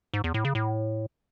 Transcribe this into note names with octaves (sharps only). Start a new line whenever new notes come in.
G#2
E2
A2
C#3
A2